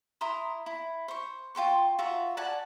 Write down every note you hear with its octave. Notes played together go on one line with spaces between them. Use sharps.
E4 A#5 C6 D#6
E4
C5 C#6
F4 G5 C6 C#6
F4 F#4 E5 A#5
D5 F#5 G#5 A5